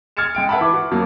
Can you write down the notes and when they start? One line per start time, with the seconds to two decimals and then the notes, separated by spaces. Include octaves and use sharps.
0.17 F6 G#6 A6 C#7 E7
0.35 G#3 G5 D7
0.49 B4 E5 F#5 A5 B5
0.61 E3 D6
0.73 F#4
0.91 F2 F#3 A#3